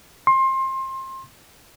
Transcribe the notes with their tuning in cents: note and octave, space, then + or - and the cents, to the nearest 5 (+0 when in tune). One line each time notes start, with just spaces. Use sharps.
C6 +25